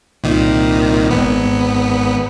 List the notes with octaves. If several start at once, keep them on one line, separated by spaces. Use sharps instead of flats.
C2 A#2 D#3
G#1 B3